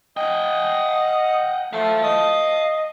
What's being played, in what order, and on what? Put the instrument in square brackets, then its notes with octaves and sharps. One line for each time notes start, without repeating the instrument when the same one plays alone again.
[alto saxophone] D#5 [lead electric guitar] F#5 G5
[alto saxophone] A3 [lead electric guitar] F5 A5
[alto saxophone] D#5